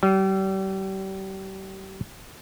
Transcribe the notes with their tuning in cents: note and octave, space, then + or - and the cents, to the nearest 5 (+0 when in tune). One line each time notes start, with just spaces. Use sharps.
G3 -35